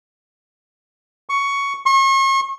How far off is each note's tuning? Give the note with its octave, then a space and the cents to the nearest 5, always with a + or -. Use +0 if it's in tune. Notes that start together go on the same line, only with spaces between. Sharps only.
C#6 +10
C#6 -40